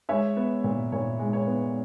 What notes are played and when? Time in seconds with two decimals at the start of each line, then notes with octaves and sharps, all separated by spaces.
0.09 G#3 C#5 E5
0.36 B3
0.64 A#2
0.92 A#2 C#5
1.19 G#3
1.33 C#5
1.47 B3